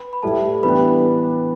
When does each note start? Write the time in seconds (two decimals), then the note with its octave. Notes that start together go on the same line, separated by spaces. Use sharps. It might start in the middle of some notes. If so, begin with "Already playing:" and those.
Already playing: B4 B5
0.13 B5
0.23 A2 G3 E4 G4 A4 A5
0.63 E3 B3 D4 G4 B4 B5